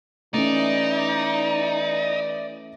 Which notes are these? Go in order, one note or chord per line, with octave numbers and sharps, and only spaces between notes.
E3 A3 C#4 D#4 D5